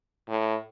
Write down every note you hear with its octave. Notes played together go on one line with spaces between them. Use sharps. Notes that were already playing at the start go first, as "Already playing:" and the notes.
A2